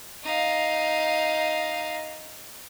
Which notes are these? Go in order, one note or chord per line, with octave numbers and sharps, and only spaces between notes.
D#4 F5